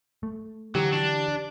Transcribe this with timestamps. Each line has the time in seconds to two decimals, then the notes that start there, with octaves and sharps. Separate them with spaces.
0.23 A3
0.75 D3 E3 F#3 G4
0.92 D4